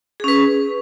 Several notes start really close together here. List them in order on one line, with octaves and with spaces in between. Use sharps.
G#4 C#4 B4